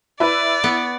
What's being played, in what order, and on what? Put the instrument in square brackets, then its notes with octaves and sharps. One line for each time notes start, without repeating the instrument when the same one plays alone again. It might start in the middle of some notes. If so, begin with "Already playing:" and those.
[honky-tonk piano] E4 B4 [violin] D5
[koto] B3